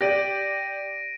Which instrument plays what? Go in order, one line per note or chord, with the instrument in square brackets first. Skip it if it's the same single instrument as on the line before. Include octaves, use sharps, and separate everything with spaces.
[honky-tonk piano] G4 D5 [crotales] A#6 D7 D#7